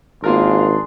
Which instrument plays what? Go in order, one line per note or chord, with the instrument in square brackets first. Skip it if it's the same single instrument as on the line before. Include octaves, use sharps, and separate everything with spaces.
[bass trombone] G#1 [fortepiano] A#3 F4 A#4 [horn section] D4 G#4 C6